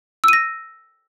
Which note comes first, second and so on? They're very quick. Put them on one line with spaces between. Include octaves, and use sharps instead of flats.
E6 D#7 A#6